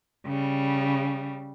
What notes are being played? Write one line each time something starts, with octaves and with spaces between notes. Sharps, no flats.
C#3 G3